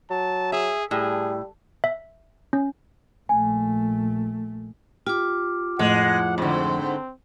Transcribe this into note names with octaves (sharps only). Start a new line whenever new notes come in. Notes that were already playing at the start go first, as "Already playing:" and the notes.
F#3 A5
G#4 E5
A2 G3 G#4
E5
C#4
A#1 A3 G#5
F4 G4 D6
F2 A2 F3 G#3 F#5
G#2 D3 C4